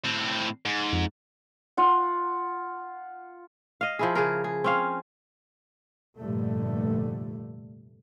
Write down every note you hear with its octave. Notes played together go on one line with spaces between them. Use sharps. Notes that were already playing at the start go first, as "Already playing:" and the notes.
A2 C4
G#2
F2
F4 F#5
D#5 F5
F3 E4 G#4
C#3 G#4 A#4
G#4
C4 C#4 F5
F1 G2 A#2 D3 A3